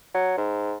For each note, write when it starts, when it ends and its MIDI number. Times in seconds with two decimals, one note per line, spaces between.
0.14 0.33 54
0.37 0.75 44